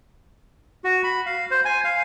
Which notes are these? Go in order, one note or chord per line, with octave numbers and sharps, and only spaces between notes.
F#4
B5
F5
C5
G#5
F5